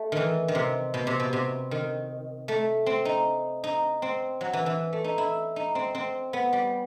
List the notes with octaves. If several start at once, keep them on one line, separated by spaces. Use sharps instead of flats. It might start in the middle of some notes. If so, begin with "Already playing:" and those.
Already playing: A3
D#3 E3
D#3
C3
B2
C3
B2
C3
D#3
A3
C4
D#4
D#4
C4
F#3
E3
E3
A3
D#4
E4
D#4
C4
C4
B3
G3